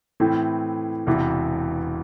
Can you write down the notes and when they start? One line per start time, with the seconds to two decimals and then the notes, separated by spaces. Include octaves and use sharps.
0.20 A2 E3 A3 C4
1.07 E1 E2 C3 E3